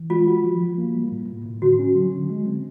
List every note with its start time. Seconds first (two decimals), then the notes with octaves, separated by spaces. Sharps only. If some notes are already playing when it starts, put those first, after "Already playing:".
Already playing: E3
0.10 G#3 F4
0.27 F#4
0.44 F3
0.61 F3
0.78 A#3
0.95 G3
1.12 A2
1.28 A2
1.45 A2
1.62 D3 F#4
1.79 C#4
1.96 F#3
2.13 D3
2.30 G#3
2.46 C4